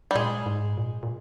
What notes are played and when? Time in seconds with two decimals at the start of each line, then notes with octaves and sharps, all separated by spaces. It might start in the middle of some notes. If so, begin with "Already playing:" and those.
0.11 G3
0.15 A#2 G#3
0.46 G#2
0.77 A#2
1.03 A#2